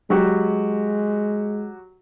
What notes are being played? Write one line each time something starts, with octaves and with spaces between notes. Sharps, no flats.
F#3 G#3 F#4 G4